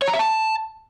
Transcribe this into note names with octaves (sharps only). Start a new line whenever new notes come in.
C#5
A#5
E5
A5